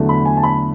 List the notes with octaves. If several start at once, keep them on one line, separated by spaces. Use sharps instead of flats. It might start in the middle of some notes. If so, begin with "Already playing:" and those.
Already playing: E2 D3 F#3 A3
B5
G#5
A5
B5